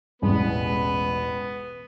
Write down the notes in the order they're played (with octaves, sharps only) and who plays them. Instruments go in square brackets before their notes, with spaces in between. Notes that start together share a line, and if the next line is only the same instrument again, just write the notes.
[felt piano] E1 A1 G#3 [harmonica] B3 B4